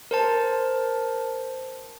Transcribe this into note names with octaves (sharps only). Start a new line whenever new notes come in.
A#4 C5 A5